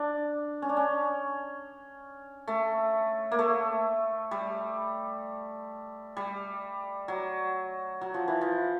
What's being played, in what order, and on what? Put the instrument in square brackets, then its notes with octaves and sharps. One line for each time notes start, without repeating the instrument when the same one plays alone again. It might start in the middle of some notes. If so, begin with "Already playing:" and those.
Already playing: [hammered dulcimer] D4
C#4
D4
C#4
A3
A#3
A3
G3
G3
F#3
F#3
F3
E3
F3